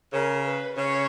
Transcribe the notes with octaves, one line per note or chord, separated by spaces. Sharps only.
C#3 A#4
B4
C#3 C#5